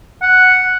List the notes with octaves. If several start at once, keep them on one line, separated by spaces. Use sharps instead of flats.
F#5